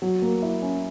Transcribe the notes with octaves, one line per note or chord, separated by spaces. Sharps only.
F#3
A#3
E4
C#4